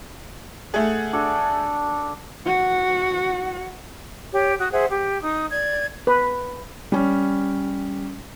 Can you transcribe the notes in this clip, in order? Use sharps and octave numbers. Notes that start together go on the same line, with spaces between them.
A3 G#4 F#5
D4 F#4 A4
F#4 F#5
G4 C#5
F#4 D#6
G#4 C5 E5 F#5
G4
D#4 D#6
D5 G#6
B4
G3 C#4